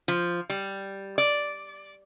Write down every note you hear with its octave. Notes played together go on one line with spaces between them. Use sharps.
F3
G3
D5